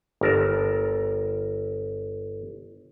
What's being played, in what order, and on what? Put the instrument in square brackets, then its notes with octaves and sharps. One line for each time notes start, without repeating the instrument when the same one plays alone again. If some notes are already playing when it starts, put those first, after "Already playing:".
[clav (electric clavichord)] G1 A#4 A5